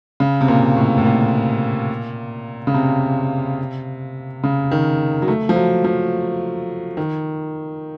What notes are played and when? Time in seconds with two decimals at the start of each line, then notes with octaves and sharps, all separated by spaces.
0.20 C#3
0.41 C3
0.48 A#2
0.76 A2
0.98 A2
1.05 A#2
2.67 C#3
2.74 C3
4.44 C#3
4.71 D#3
5.22 F#3
5.28 A3
5.49 F3
5.56 F#3
5.84 F3
6.97 D#3